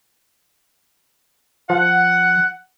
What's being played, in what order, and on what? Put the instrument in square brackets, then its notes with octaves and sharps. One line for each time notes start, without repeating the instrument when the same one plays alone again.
[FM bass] F3 [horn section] F#5